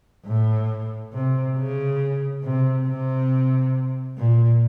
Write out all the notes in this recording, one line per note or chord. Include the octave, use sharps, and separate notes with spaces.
A2
C3
C#3
C3
C3
A#2